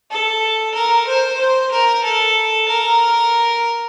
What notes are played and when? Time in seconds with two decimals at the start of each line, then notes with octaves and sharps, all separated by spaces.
0.11 A4
0.74 A#4
1.07 C5
1.39 C5
1.71 A#4
2.04 A4
2.68 A#4